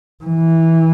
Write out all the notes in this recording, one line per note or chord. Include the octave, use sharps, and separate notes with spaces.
E3